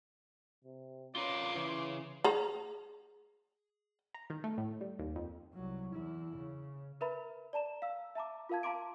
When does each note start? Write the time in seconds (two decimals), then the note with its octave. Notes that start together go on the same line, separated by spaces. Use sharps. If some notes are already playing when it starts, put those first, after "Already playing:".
0.64 C3
1.16 C#4 F4 A#4 B4 C6 D6
1.55 C#3 E3
2.24 G#4 A#5
4.15 A#5
4.30 D#3
4.44 A3
4.58 A2
4.81 G3
4.99 D#2
5.16 F2
5.54 C2 F#3
5.94 E2 E4
6.36 C#3
7.01 A#4 B4 E5 A#5 B5
7.53 D5 A5 A#5 E7
7.82 F5 E6
8.15 E5 A5 A#5 D6
8.49 F4 A#4 F5 A5 G#6
8.63 F5 A5 A#5 C6 D6 D7